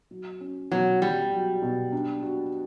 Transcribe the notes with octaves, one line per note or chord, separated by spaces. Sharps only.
F#3
C#4
B2 F#3
G3 F#4
F#3
B2
D4
F#4